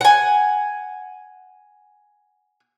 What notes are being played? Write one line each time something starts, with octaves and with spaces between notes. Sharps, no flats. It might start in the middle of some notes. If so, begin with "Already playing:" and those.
F#5 G#5